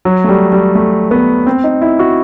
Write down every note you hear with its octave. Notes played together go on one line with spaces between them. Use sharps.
F#3
A3
G3
G3
A3
B3
C4
D#4
E4
F#4